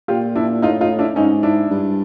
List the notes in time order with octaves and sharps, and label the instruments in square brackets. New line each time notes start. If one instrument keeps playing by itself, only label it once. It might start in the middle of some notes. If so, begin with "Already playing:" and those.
[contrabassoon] A#2 [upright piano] F4 G4
[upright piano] D4 E4
[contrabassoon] A2 [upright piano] D#4 F4
[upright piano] D#4 F4
D4 E4
[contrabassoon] G#2 [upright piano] C#4 D#4
[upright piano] D4 E4
[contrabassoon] G2